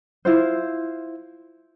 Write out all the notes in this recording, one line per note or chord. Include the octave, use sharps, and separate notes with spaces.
E4 F4 C5